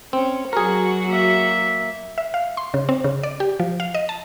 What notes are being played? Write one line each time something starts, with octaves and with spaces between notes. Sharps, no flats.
C4 C#4
F#3 F#4 G#4 A#4 C#6
A#3 E5
E5
F5
C6
C#3
C4
C#3
D5
G4
F3
F5
D#5
A5